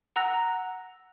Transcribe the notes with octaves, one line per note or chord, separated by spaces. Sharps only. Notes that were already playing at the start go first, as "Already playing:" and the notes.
F#5 A#5 E6 F#6 A#6